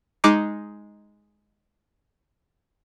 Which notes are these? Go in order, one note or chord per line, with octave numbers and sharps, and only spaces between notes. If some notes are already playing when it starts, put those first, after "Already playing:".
G#3 D#4 D6